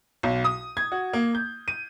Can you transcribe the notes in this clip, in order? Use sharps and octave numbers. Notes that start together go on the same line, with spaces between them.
B1
D#6
G#6
F#4
A#3
G6
D#7